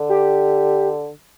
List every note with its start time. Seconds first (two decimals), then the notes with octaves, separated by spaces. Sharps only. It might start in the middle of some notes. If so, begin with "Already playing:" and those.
Already playing: D3
0.09 G4